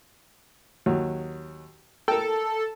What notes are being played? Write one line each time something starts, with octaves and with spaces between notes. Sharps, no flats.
D#2 F#3
A4 A#4 G5